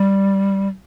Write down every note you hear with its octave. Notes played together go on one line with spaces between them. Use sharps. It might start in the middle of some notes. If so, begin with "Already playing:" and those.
Already playing: G3